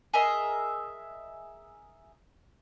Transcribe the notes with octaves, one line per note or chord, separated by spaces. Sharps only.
G#4 A#4 D#5 E5